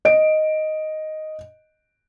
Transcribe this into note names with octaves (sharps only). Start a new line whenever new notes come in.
D#5 D7